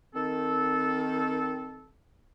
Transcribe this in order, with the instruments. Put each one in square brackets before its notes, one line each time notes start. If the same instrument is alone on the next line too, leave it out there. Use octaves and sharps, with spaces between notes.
[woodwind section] D#3 C4 A4